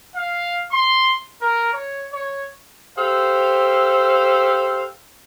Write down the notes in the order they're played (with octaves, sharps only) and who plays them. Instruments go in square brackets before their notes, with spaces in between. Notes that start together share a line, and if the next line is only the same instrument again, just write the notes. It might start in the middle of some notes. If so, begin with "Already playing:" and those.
[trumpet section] F5
C6
A#4
C#5
C#5
[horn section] G4 A4 C5 F5